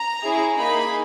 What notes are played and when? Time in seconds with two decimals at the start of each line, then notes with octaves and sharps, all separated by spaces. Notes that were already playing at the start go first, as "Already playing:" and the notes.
Already playing: A#5
0.23 C#4 E4 G#4
0.59 A#3 D#4 G#4 B5